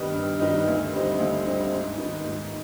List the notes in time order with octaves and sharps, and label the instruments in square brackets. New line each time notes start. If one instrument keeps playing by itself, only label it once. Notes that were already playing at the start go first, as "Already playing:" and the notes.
Already playing: [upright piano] G2 D#3 G3 B3 D#4
G2
D#3 G3 B3 D#4
D2
D3 G3 C4 D#4
D2
D3 G3 C4 D#4
G#2
D#3 B3 D#4
G#2